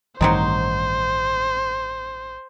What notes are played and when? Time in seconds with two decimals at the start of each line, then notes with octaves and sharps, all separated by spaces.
0.21 A1 G2 D#3 F#3 C4 D#4 C5